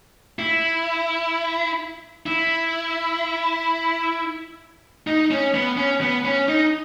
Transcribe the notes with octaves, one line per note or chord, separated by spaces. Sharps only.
E4
E4
D#4
C#4
B3
C#4
B3
C#4
D#4